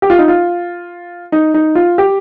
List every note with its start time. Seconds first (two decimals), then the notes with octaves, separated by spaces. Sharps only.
0.02 G4
0.10 F4
0.19 D#4
0.28 F4
1.32 D#4
1.54 D#4
1.75 F4
1.98 G4